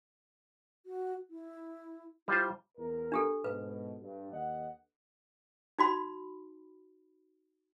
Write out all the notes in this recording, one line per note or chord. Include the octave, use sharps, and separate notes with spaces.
F#4
E4
G3 E4 F4 C5
E2 A#4
D4 G4 A4
G#2 B2 B4
G2
D#2 D#5 F#5
D#4 F#4 B5